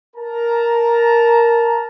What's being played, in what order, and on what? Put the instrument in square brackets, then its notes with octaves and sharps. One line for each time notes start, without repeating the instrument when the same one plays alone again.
[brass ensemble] A#4 A5 A#5